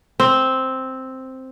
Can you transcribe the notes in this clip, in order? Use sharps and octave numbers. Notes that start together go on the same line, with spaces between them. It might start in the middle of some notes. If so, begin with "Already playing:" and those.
C4